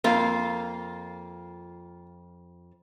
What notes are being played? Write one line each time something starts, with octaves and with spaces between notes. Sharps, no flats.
F2 A#3 F4 F5